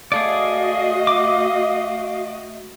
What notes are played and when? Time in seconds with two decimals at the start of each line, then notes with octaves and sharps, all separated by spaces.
0.12 A3 F#4 G#4 A4 D5 D#5 F5
1.07 D6